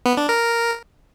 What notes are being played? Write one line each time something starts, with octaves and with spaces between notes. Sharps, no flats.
B3
D4
A#4